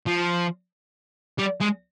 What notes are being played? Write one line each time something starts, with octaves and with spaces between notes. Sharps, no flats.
F3
G3
G#3